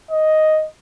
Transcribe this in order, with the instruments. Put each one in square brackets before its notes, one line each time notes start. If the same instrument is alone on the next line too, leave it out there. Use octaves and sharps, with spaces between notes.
[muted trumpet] D#5